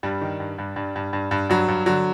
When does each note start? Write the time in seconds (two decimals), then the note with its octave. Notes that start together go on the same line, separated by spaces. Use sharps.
0.03 G2 G3
0.21 D#3
0.40 G2
0.58 G2
0.76 G2
0.96 G2
1.13 G2
1.31 G2
1.49 G2 F#3
1.68 G2
1.86 D3 F#3